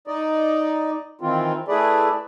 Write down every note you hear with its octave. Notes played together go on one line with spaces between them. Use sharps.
D#4 D5 D#5
D#3 E3 C4 F4
A3 E4 G#4 B4 D5